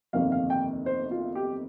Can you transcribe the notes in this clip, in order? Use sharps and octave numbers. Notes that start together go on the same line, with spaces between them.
G1 F2 C3 D#3 A#3 F5
F5
G5
C5
F4
G4